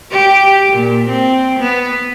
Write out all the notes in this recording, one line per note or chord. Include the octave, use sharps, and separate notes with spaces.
G4
A#2
C4
B3